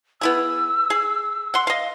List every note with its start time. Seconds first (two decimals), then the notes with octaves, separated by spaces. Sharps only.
0.21 B3 E4 G#4 E6
0.90 G#4
1.54 F#5 C6
1.67 D#5 F5